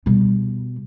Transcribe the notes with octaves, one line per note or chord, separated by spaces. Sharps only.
B2 G3